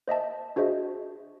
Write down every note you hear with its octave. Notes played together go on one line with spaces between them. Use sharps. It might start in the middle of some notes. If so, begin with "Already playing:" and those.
C5 D#5 E5 A5
D4 F#4 G#4 C5 D#5 E5